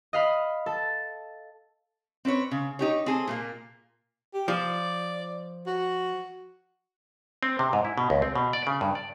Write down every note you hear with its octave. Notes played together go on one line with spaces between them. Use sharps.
D#5 F5 B5
A4
C4 C#4 B4 C#5
C#3
D#4 G4 C#5
C4 G#4 A4
A#2 A3 A#3
G4
F3 D5
F#4
C4
C3
G#2
E4
B2
C#2
C4
B2
D5
C#3
G2
D5